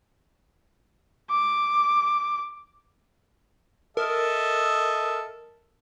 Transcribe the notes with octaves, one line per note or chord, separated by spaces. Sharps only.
D6
A4 A#4 D#5 E5